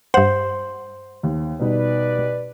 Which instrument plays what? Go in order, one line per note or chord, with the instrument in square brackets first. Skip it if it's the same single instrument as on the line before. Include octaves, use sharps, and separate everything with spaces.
[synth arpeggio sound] G2 F#5 [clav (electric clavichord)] C5
[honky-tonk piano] D#2
[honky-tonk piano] B2 G3 D#4 [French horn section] B4 D5